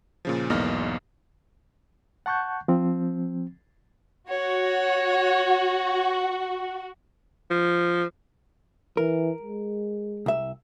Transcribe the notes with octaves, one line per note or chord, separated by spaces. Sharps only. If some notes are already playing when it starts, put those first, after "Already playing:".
A#2 C#3 F3
B1 E2 G#2 A#3 D#5 F6
F#5 A5 C#6 F#6 G6
F3 C4
F#4 C#5
F3
E3 A#4
G#3
C2 E5